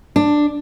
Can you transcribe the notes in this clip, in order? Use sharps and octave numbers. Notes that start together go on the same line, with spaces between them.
D4